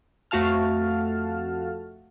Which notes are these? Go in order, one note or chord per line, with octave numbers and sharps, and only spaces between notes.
F2 A3 F#4 F5 A5 F6